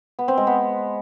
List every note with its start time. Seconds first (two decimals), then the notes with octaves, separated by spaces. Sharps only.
0.19 B3
0.28 C4
0.37 G#3
0.47 B3